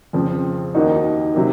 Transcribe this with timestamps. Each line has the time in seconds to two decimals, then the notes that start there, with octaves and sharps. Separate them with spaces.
0.13 F2 C#3 F3 C4
0.75 D#2 D#3 A#3 D#4 F#4
1.34 C3 F#3 A#3